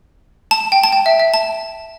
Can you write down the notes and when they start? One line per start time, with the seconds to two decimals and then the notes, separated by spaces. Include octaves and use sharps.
0.51 A5
0.72 G5
0.84 A5
0.92 G5
1.06 E5
1.20 E5
1.34 A5